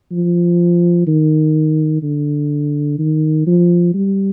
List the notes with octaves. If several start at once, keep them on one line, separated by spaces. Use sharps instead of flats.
F3
D#3
D3
D#3
F3
G3